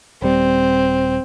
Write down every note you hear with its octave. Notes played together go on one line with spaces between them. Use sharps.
D#1 G3 C4